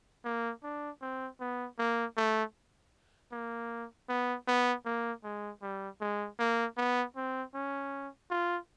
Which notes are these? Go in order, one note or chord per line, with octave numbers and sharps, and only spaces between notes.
A#3
D4
C4
B3
A#3
A3
A#3
B3
B3
A#3
G#3
G3
G#3
A#3
B3
C4
C#4
F4